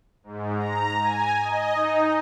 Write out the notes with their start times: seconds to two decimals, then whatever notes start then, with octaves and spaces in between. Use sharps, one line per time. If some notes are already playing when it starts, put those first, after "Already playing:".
0.24 G#2
0.55 A#5
1.00 G#5
1.42 D#5
1.75 D#4